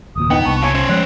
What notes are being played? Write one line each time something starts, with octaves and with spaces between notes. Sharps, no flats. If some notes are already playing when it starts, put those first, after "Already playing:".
F#1 D#2 A#2 D#6
B3 D#4 B4 G5
C2 A5 C#6
F4 C#5 G#5
C#4 C5
F3 G#3 C#5 F#6